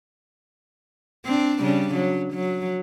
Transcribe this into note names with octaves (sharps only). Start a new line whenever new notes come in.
C4 D4
C#3 G3 D4
F#3
F#3